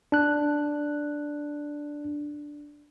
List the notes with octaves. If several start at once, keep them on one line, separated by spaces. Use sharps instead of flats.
D4 F#6